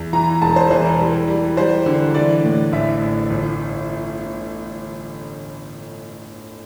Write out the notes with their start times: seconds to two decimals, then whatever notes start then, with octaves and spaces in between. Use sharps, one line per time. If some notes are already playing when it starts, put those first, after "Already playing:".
Already playing: E2
0.13 E3 A#5
0.42 E1 A5
0.56 C5
0.71 E3 C5
0.85 A#4
1.00 G3
1.28 G3
1.57 G3 C5
1.86 D3
2.14 E3 D5
2.44 A2
2.72 A1 E5
3.01 A1
3.30 G1